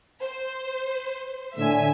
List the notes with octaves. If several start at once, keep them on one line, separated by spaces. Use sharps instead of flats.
C5
A2 D3 A3 E5 G#5